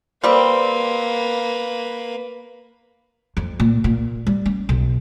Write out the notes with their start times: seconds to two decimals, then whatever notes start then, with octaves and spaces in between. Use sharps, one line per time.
0.24 G3 A#3 C4 B4
3.37 F2
3.60 A#2
3.84 A#2
4.27 G3
4.46 C#4
4.69 B1